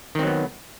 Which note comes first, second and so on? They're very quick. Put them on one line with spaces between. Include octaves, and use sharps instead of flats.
D#3 C4 F#3 B3